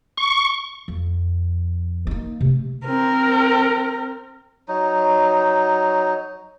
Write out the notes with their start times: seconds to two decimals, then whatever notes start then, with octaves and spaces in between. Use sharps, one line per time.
0.17 C#6
0.88 F2
2.07 A#3 D#4
2.41 C3 A3
2.86 C4 A#4
4.68 F#3 D#4